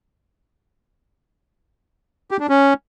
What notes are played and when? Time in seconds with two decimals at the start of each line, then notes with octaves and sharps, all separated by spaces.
2.31 G4
2.40 D4
2.49 C#4